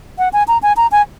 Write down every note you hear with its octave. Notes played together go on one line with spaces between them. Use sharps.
F#5
G#5
A#5
G#5
A#5
G#5